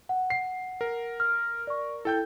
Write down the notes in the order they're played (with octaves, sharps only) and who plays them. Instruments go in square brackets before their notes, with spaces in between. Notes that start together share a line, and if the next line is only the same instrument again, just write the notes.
[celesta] F#5
[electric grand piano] C7
A#4
[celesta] F6
D5 C#6
[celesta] E4 [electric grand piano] A4 G5 G6